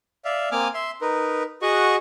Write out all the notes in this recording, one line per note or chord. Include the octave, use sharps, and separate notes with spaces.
D5 E5 F5
A#3 C4 G#5 D6 D#6 F6
E5 C6
D#4 A#4 B4
F#4 G#4 D#5 F#5 C#6